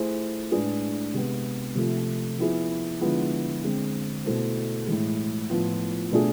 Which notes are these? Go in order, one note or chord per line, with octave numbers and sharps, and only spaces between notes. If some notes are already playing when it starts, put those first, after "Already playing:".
Already playing: A3 E4 G#4 C5
A2 G#3 D4 G#4 B4
C3 G#3 B3
C3 F3 A3
F3 B3 E4 G#4
D3 F3 G#3 B3 E4
D3 G#3 C4
B2 A3 E4 A4 C5
A2 E3 G#3
A2 F3 B3 F4
B2 A3 D4 G#4